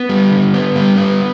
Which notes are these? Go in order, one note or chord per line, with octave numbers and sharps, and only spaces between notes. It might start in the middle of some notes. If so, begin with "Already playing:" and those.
Already playing: B3
G3
D3
B3
G3
B3